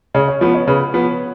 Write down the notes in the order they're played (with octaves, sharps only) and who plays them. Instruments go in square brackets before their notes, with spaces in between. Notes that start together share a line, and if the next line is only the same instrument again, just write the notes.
[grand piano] C#3 [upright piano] C#5
[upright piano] C#5
[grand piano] F3 B3 [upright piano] B4
[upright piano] C#5
[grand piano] C#3 [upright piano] B4
[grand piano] F3 B3